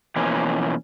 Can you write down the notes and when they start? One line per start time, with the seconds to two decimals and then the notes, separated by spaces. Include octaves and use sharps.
0.16 B2 E3 F3 A#3 C#4